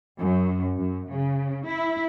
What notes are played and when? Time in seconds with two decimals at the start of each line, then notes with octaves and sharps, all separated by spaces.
0.17 F#2
0.74 F#2
1.09 C#3
1.66 E4